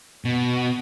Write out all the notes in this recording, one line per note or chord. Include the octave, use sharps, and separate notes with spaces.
B2